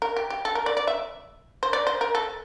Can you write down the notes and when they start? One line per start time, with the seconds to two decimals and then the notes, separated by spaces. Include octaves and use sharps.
0.02 A#4
0.17 G4
0.30 G4
0.45 A4
0.55 A#4
0.66 D5
0.77 D5
0.87 E5
1.63 C5
1.73 D5
1.87 C5
2.01 A#4
2.15 A4